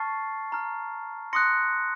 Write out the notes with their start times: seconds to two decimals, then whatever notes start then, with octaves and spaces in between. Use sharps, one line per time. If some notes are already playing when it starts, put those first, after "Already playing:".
Already playing: A5 C#6 F6 A6 C7
0.52 A#5 F6
1.33 C6 D#6 F#6 A#6 C#7